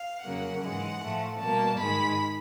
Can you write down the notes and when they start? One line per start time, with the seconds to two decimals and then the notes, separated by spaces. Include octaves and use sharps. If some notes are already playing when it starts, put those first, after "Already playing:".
Already playing: F5
0.24 F2 C#3 F#3 A#3 F#5
0.64 G#2 E3 G#3
1.02 A2 F3 A3
1.40 B2 G3 A#3 A5
1.79 G#2 D#3 G#3 B5